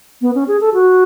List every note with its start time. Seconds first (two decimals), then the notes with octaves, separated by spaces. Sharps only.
0.22 B3
0.35 C#4
0.48 G#4
0.61 A4
0.74 F#4